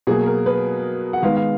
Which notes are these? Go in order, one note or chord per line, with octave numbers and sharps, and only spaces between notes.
B2 F#3 A#3 G#4
A#4
B4
F#5
D#3 G#3 B3 F5
F5